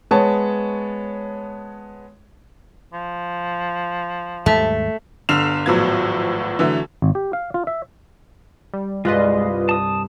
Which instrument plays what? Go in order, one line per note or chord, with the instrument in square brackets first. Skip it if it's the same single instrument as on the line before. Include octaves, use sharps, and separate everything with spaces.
[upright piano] G#3 B3 C#5 A5
[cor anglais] F3
[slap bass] D#2 G#2 G3 [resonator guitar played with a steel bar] A3
[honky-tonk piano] G1 D3 F6 C7 E7 F7
G#1 A2 F3 F#3 B3 G#6
D3 E3 F#3 A3
[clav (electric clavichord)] G#1
G4
F5
F4
E5
[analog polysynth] G3
[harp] C2 G2 [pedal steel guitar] G#3 [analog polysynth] F4 B4 D#5
[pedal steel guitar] A5 D#6